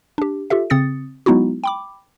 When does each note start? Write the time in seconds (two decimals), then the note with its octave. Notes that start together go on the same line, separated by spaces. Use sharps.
0.18 D4 G4
0.50 F4 G4 A4 E5
0.70 C#3 C4 D#6 A6 C#7
1.26 F#3 G#3 B3 D#4 E4 F#4
1.64 G5 B5 D6